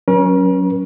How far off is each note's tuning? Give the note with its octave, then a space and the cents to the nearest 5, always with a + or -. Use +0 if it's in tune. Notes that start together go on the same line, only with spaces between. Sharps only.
F#3 +0 C#4 +0 A#4 +45